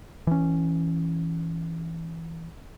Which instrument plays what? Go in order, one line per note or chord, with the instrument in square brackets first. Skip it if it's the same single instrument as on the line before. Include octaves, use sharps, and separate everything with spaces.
[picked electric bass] E3 C#4